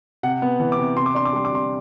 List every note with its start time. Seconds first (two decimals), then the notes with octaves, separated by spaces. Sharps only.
0.23 C3 F#5
0.42 B3
0.60 E3
0.72 D6
0.78 C3
0.96 C3 C6
1.06 D6
1.15 D4 C6
1.25 D6
1.33 G3 C6
1.45 D6
1.51 C3 C6